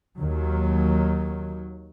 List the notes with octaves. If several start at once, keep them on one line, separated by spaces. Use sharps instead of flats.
D#2 D#3 F#3